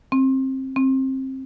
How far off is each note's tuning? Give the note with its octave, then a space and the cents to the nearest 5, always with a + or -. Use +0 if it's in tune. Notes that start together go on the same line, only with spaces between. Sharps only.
C4 +20
C4 +20